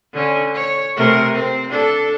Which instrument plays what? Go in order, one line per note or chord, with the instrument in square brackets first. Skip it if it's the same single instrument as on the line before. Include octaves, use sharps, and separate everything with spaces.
[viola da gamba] D3 C#4
C#5
C3 A3 A#4
C4
D4 A4